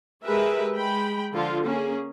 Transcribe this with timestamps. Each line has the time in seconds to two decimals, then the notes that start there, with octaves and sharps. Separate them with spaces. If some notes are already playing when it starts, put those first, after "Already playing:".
0.23 G#3 G4 G#4 A#4 B4 E5
0.75 G#3 G5 B5
1.32 D3 F3 F4
1.64 A#3 C#4 G#4